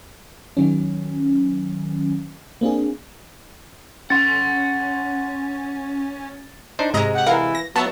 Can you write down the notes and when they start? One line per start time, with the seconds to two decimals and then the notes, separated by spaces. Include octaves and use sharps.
0.57 D#3 F#3 C#4
2.61 A#3 C4 D4 G#4
4.10 C#4 F#5 C6 A6
6.79 D4 D#4 C5
6.94 G#2 C3 G#3 D#5 A#5
7.15 G4 F#5
7.26 E3 A#4 F5 F#5
7.55 A#6
7.76 F#3 B3 F#4 E5 A5